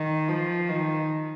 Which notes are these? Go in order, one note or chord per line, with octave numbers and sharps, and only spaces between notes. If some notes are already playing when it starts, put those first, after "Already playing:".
Already playing: D#3
F3
D#3